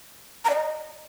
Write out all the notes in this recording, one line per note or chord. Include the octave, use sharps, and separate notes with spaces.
A#5
D5
D#5